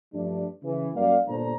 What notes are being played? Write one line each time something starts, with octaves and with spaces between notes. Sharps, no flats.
G2 F3 G3 A3 D4
C#3 E3
F#2 G3 A#3 D5 F5
G1 A#2 D4 A4 C5 A#5